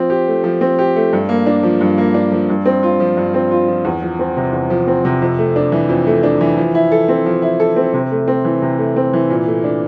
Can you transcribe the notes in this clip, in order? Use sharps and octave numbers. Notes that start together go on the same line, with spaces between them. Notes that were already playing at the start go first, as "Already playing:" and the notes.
Already playing: F3 C4
G4
A3
F3
C4
G4
A3
G2
A#3
D4
F3
G2
A#3
D4
F3
G2
C4
F4
F3
G2
C4
F4
F3
E2
F3
C4
C3
E2
F3
C4
C3
F2
A3
D4
E3
F2
A3
D4
E3
F3
E4
A4
C4
F3
E4
A4
C4
C3
A3
C4
E3
C3
A3
C4
E3
A#2
A3
D4